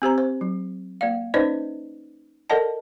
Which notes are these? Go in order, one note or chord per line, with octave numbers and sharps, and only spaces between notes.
C4 G4 C5 A#5
C5
F#3
A#3 D5 F5
C#4 D#4 B4 C5 D5 D#5
A4 A#4 D5 D#5 F#5 A5